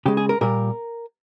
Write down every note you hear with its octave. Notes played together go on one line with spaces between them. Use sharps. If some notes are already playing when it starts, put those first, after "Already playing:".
C#3 G#3 G4
G#4
A#4
A#2 G3 A#4